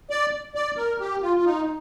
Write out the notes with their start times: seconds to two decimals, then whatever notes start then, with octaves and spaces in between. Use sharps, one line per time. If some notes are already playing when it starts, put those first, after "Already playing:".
0.10 D5
0.55 D5
0.77 A#4
1.00 G4
1.22 F4
1.37 F4
1.45 D#4